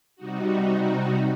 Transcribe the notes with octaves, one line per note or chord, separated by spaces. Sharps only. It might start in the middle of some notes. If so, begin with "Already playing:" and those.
C3 G3 D#4 F#4